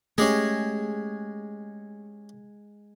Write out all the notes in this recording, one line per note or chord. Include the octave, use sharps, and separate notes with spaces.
G#3 A3 C#4 G4 G#4